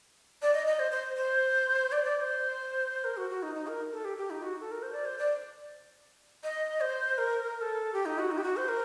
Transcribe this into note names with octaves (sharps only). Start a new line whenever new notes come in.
D5
D#5
D#5
C5
C5
C5
D5
D5
D5
C5
A#4
F#4
F#4
D#4
D#4
A#4
A4
G4
G4
D#4
F#4
A4
A#4
C5
D5
C5
D5
D#5
C5
A#4
A#4
A4
G4
D#4
F#4
D#4
G4
F#4
C5
A#4